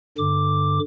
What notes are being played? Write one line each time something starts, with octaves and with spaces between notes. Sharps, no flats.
G2 D3 D6